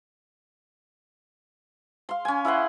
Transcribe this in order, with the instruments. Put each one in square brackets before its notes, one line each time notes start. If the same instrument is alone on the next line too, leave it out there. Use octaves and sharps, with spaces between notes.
[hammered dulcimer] F5 C6
C#4 G#5
E4 D#5 F#5 C6